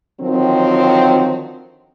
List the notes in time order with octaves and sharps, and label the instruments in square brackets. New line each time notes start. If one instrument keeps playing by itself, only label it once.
[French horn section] D3 D#3 F3 F#3 C4